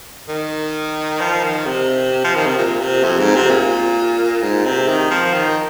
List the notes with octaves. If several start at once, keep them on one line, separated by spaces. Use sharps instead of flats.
D#3
F3
D#3
C3
F3
D#3
C3
A#2
C3
F2
G#2
C3
A#2
G#2
C3
D#3
F3
D#3